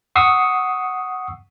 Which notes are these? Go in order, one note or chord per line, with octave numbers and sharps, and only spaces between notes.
F#5 C#6 D#6 E6 C7 C#7